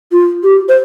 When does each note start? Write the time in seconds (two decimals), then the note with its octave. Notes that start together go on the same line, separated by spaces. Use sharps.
0.12 F4
0.43 G4
0.69 C5